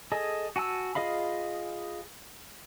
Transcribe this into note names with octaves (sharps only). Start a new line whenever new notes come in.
G#4 A4 D#5 G#5
F#4 G#5 A5 E6
F4 G#4 D#5 F5 B5